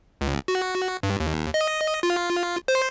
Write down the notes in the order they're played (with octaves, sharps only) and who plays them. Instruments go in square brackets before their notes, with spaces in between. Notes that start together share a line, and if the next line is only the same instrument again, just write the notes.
[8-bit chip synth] C#2
F#4
G2
D#2
D#5
F4
C5